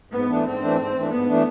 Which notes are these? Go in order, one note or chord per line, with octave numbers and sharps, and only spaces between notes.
G#2 B3
E3 A3 D4
G#2 C4
E3 A3 D4
G#2
E3 A3 D4
G#2 B3
E3 A3 D4